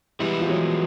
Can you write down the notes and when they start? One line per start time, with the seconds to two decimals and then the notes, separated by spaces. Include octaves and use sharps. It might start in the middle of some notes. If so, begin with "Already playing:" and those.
0.19 E3 G3 G#3 B3 E4
0.41 F3
0.49 F#3